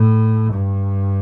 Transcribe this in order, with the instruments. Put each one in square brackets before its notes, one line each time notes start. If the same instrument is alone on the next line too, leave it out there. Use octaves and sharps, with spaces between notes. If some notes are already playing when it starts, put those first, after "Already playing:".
Already playing: [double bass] A2
G2